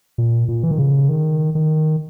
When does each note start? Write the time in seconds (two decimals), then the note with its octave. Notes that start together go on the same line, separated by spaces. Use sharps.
0.18 A#2
0.48 A#2
0.64 E3
0.71 D#3
0.79 C#3
1.09 D#3
1.55 D#3